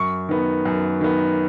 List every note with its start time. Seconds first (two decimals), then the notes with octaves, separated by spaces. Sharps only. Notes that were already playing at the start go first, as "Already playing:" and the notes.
Already playing: F#2 C#6
0.29 D#3 B3
0.65 F#2
1.01 D#3 B3